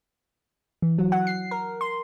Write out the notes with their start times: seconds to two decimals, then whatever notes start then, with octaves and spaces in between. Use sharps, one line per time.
0.82 E3
0.98 F#3
1.12 F#5
1.27 C7
1.51 A#4
1.81 C6